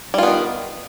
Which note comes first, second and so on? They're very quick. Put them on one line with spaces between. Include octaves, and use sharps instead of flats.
G3 F4 B3 D#3